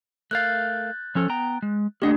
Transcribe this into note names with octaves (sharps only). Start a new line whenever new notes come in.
A3 A#4 F5 F#6 G6 A6
F3 C#4 A4
B3 G5 A#5
G#3
A3 A#3 D4 G4 D#5 F#5